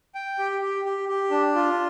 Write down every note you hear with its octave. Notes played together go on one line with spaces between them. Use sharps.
G5
G4
G4
G4
G4
D4
F4